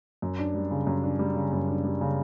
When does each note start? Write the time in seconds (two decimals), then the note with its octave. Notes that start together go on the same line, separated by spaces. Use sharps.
0.22 F#2
0.39 D4
0.55 G3
0.71 C#3
0.87 F#2
1.03 D4
1.19 G3
1.35 C#3
1.53 F#2
1.68 D4
1.84 G3
2.01 C#3